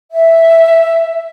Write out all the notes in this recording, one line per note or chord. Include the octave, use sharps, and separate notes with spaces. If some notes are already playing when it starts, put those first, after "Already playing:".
E5